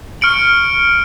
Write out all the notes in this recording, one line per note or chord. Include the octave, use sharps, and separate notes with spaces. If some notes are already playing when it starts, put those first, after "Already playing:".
C#6 F6 C#7 D7 F#7